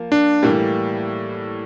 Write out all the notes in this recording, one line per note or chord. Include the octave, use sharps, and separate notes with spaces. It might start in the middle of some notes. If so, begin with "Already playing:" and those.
Already playing: F3 A#3
D4
A2 E3 G3 A#3